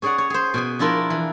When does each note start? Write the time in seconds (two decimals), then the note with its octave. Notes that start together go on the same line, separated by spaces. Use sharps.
0.02 C#4 G#4 C#5 D5 F#5
0.18 C#5
0.30 G#4 C5
0.54 B2 G#4 G#5
0.79 F3 D4 E4 F4 A#4
1.10 E3